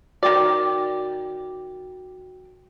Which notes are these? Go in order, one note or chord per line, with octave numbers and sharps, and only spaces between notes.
D#3 F#4 D5 G5